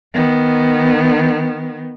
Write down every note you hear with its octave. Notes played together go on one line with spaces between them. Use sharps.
D#3 B3